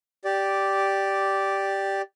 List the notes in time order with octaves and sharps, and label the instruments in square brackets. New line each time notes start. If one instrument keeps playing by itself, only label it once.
[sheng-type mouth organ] G4 D5